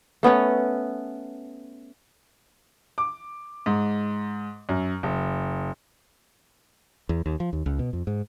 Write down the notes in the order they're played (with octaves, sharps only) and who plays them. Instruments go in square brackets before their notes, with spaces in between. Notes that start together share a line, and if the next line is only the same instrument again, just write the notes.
[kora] A3 B3 C#4 C#5
[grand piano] D6
G#2
F#2
F#1
[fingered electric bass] E2
D#2
F3
D#2
C#2
B2
F2
G#2